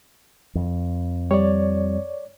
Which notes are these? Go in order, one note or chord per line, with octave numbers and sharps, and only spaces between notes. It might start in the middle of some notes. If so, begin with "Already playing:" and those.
F2
G3 C#5 D5